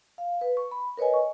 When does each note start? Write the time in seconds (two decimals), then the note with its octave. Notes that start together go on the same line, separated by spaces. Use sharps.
0.18 F5
0.41 B4
0.57 C#6
0.71 B5
0.97 A#4 B4 C#5 D#5 G#5
1.14 C#6